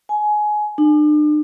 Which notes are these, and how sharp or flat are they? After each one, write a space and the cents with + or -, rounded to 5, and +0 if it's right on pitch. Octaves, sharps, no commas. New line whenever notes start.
G#5 +20
D4 +40